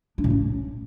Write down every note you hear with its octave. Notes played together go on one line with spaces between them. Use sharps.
D4
A2
C#4